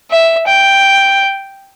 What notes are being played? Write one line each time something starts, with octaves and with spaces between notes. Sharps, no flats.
E5
G5